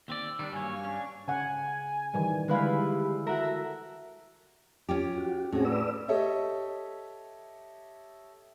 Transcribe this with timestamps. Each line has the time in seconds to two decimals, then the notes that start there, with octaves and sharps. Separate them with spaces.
0.08 D#2 C4 D5 E6
0.39 D#3 G3 D4
0.52 G2 F#3 A#3 C#5 G#5
0.70 F5 G#5 C#6
0.84 C#4 D4
1.28 C#3 F#5 G#5
2.14 D#3 E3 G3
2.48 D3 G3 G#3 E4 B4 F5
3.27 F#4 A4 A#4 E5
4.89 C#4 F4 G4
5.18 F#4
5.52 A2 C4 C#4 F#4 G#4
5.65 B4 D5 E6
6.08 G4 A4 C#5 D#5 E5